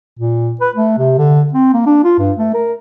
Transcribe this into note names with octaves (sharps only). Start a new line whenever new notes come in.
A#2
B4
A3
C3
D3
C4
A#3
D4
F4
G2
A3
A#4